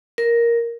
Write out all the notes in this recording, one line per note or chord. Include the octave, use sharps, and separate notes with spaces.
A#4